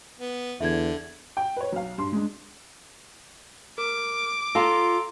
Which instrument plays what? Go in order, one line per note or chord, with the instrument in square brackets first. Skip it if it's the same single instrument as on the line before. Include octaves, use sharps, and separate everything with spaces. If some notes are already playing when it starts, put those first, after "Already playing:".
[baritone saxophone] B3
[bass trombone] E2 [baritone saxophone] D3 [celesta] E5 G#6
[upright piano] G5
B4 C#5
B1 F5
G2 C6
G#3 D4
[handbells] A#4 [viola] D6
[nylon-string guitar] F4 F5 A5 [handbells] A4 A#5 C6